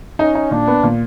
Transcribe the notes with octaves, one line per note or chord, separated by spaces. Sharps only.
C#4 D#4
D#4
A#2 D4
B3
A#2